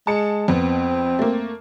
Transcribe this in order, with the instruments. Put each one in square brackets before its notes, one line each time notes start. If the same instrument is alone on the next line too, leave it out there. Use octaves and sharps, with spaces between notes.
[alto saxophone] G#3 [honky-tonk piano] A5 C#7
[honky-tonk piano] F2 B3 [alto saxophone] C4
[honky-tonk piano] A3 A#3